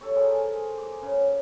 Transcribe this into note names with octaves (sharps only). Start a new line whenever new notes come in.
A4 C#5
G#4 A#4 C5 G#5
D6
C#3